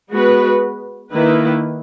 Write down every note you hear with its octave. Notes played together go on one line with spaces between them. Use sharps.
G#3 B3 F#4 B4
D#3 A#3 E4 B4